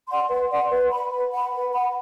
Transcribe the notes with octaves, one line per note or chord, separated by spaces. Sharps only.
D5 F#5 C6
B4
D5 F#5 C6
B4
F#5 B5
B4
F#5 B5
B4
F#5 B5